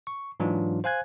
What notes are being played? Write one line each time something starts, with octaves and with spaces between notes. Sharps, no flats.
C#6
G#2 E3 F#3 D4 F4
C5 F5 G#5 F#6 G#6